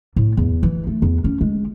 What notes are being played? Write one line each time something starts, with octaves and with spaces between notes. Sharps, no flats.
A2
E2
E3
A3
E2
C#4
G#3